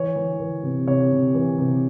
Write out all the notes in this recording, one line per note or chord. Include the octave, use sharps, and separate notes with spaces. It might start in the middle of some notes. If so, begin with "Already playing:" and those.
Already playing: E3 C#5
E3
E3
C3
C3 C#5
C3
E3
C3